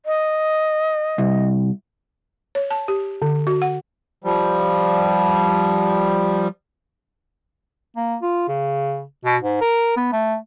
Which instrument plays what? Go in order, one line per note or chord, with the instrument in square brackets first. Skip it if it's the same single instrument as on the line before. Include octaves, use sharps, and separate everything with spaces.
[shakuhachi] D#5
[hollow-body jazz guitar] C2
[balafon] C#5
A5
G4
D3
F#4
F#5
[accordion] F3 G3
[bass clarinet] A#3
F4
C#3
B2
G#2
A#4
B3
A3